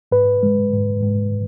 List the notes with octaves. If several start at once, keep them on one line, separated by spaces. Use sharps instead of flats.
G#2 B4
G#3
G#2
G#2